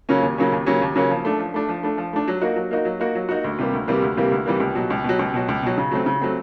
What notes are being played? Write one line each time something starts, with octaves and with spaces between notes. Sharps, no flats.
C#3 F#3 A#3 C#4
D#2
C#3 F#3 A#3 C#4
D#2
C#3 F#3 A#3 C#4
D#2
C#3 F#3 A#3 C#4
F3
A3 D4
F3
A3 D4
F3
A3 D4
F3
A3 D4
F#3
A#3 D#4 F#4
F#3
A#3 D#4 F#4
F#3
A#3 D#4 F#4
F#3
A#3 D#4 F#4
D2
C3 E3 G3 A#3
D2
C3 E3 G3 A#3
D2
C3 E3 G3 A#3
D2
C3 E3 G3 A#3
C#2
B2 F#3
C#2
B2 F#3
C#2
B2 F#3
C#2
B2 F#3
C#3
F#3 A3 C4
C#3
F#3 A3 C4